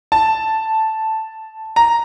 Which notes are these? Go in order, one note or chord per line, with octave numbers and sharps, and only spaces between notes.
A5
A#5